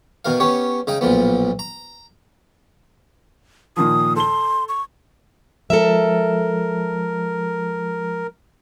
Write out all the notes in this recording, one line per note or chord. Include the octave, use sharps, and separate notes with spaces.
B2 D#3 A#4 F5
B3 C#4 G4 C#5
C#3 D#4 D#5 G5
B1 A#2 F3 B3
A#5
A#2 D#3 F3 D#6
A4 C6 G7
C#6
F3 G#3 A4 A#4 E5